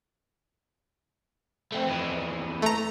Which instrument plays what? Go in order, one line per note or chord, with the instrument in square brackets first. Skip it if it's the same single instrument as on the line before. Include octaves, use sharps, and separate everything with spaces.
[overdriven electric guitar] A3 C4
F2 E3
[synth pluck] A3 A#5